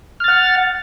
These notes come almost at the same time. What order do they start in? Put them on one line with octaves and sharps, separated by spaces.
F6 A6 F#5